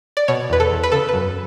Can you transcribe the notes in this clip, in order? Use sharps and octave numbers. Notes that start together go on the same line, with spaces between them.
D5
B2 C#5
E2 B4
A4
E2
B4
C#3 A4
B4
F#2